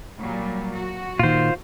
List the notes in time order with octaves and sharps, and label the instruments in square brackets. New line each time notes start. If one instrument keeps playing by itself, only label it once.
[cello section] A#2 F#3 G3
F#4
[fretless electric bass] A#2 D#3 [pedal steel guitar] F4 C5